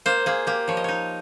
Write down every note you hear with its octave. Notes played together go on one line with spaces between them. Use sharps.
A#3 C5
A#3 G#4
A#3 G4
F3 C#5
D#5
D#4 C#5